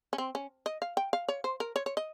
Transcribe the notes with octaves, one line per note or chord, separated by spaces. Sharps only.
C#4
C4
C#4
D#5
F5
G5
F5
C#5
C5
A#4
C#5
C#5
D#5